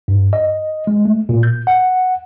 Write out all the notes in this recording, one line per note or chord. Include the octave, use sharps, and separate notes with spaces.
G2
D#5
G#3
A3
A#2
G6
F#5